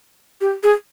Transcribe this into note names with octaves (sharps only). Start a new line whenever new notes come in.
G4
G#4